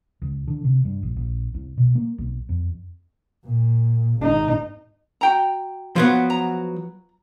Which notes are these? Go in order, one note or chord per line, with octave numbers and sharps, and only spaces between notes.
C#2
D3
C3
G2
A#1
A#1
C2
B2
A#3
B1
F2
A#2
G#1 D#4
F#4 G5 A#5
F3 F#3 B3
A#5